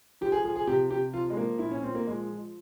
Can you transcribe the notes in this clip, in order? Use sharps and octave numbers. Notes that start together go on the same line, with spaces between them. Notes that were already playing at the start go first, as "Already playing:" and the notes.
F3 G4
G#4
F3 G#4
G#4
C3 G4
C3 G4
F3 F4
G#3
F3 A#3
A#2 E4
C#4
A#2 C4
A#3
F3 G#3
F3